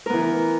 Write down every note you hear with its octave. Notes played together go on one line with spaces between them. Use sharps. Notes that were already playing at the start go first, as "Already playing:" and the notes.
E3 B3 A#4